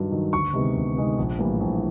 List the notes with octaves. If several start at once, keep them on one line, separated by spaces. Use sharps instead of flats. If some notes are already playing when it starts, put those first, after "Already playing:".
Already playing: G2 D#3 F#3
D#3 F#3
D2 C#6
C3 D#3 G#3 B3
D2
C3 D#3 G#3 B3
A#1
A2 E3 G3 A#3
A#1